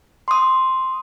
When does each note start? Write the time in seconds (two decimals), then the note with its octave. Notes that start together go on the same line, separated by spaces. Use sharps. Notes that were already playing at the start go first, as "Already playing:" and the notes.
0.28 C6 D#6